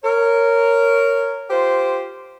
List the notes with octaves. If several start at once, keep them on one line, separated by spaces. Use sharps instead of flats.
A#4 C#5
F4 G4 C5